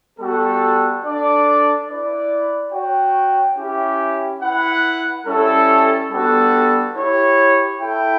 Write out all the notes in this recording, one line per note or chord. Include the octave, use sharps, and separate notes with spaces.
G3 B3 F#4 A4
D4 A4 D5
E4 B4 D5
F#4 C#5 G5
C#4 E4 G4
E4 B4 F#5
G3 C#4 E4 A4
G3 B3 D4 F#4 A4
E4 G4 C#5
E4 A4 E5 G5